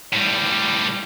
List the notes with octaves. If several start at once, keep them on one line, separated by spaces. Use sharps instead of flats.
A2 G3